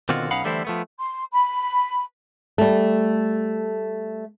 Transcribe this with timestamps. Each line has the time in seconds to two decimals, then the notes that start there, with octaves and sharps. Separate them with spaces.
0.09 B2 D3 D#3 C4 F4 F#4
0.31 B1 C#4 D#4 F5 F#5 B5
0.44 D3 E3 G3 A3 E4 C5
0.65 F3 A3 B3
0.99 C6
1.32 B5
2.58 G3 A3